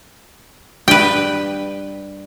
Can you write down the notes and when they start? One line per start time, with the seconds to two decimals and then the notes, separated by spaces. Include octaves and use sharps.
0.88 G2 G4 B4 G5